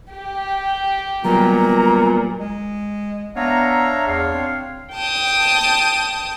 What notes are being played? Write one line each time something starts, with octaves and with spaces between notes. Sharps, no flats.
G4
A#2 F#3 G3 B3 A#5
G#3
B3 D4 C#5 E5 F5 A#5
E2 F5
C4
G5 A5 D#6